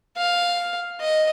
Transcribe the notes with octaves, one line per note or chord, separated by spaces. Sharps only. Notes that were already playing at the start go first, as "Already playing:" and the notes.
F5
D#5